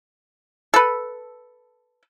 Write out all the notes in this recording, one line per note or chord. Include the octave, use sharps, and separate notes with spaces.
A4 B4